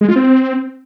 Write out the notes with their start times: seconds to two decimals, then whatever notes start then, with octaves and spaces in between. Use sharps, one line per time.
0.01 G#3
0.08 F4
0.16 C4